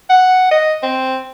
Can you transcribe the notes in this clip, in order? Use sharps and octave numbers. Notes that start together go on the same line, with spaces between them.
F#5
D#5
C4